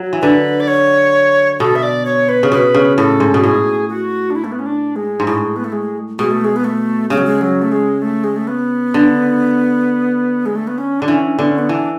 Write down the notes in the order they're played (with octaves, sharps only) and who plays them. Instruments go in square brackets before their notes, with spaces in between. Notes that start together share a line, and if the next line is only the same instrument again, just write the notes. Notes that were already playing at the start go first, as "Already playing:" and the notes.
Already playing: [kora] F#3
E3
[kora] D3 [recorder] B4
[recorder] D5
C#5
[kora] B2 [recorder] A4
[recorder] E5
D5
C#5
B4
[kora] C#3
[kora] B2 [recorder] B4
[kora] C#3
[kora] A2 [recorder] A4
[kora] G#2
B2
[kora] A2 [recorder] G#4
[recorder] F#4
D4
E4
A3
B3
C#4
D4
G#3
[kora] G#2
[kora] A2 [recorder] G#3
[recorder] B3
A3
G#3
[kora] B2 [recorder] G#3
[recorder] A3
G#3
B3
A3
[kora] C#3 [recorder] G#3
[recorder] F#3
G#3
F#3
A3
G#3
A3
G#3
A3
B3
[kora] D3
[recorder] G#3
A3
B3
C#4
[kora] D3 [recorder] D4
[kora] E3 [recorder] C#4
[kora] D3 [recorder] B3
[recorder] C#4
B3
[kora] E3 [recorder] D4